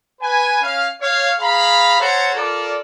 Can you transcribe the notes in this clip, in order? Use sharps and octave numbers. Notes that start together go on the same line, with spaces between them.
B4 G#5
C#4 F5
C#5 F5
G#4 F5 A#5 B5
A4 C5 C#5 F#5 A#5
F4 A4 A#4 D5